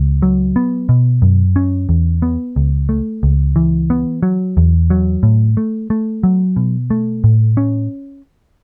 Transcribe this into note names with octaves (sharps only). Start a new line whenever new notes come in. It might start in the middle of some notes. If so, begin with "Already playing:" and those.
Already playing: C#2
F#3
B3
B2
F#2
C#4
E2
B3
C#2
A3
C#2
E3
B3
F#3
E2
F#3
A2
A3
A3
F#3
B2
A3
A2
C#4